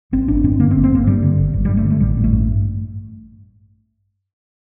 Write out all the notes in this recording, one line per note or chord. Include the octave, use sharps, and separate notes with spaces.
G1 C4
G1 D4
G2 C4
D3 A#3
C4
G1
C4
G1 A#3
G2 G3
D3
G1
G1
G2 G3
A3
D3
A3
A1 G3
A1
A3
G2